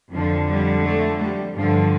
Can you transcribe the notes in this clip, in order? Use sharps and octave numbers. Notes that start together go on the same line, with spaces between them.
F2 D3 F3
G3
A3
G3
G2 D3 F3